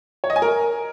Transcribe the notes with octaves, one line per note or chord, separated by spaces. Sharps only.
C#5
D#5
G#5
A#4